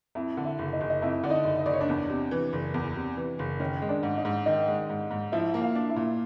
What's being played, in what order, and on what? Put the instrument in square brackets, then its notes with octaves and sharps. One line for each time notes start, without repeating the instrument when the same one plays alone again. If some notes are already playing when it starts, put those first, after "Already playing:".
[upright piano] F2 [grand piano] E4 E5
[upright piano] D3
[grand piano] E4 E5
[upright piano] F#1
[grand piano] D#4 D#5
[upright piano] F#1
[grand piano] D#5
[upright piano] F2 [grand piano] E4 E5
[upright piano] D3 [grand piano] D5
[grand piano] D#4 D#5
[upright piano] F#1
[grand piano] D#5
[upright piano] F#1 [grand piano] D5
[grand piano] C#5
D4 D5
[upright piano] E2
C3
E3
F#1
E2
C3
E3
F#1
[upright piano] D#3 [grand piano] C#4 C#5
[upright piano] G#3
[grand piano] D4 D5
[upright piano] G#2
[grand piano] D#4 D#5
[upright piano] G#2
[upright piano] D#3 [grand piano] D#4 D#5
[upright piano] G#3
G#2
G#2
[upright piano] F3 [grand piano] E4 E5
[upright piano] A#3
[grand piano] F4 F5
[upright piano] D4
[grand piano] E4 E5
[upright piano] A#2